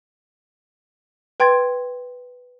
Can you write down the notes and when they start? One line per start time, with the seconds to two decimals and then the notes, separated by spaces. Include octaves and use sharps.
1.40 B4 G5 C6 G#6 A6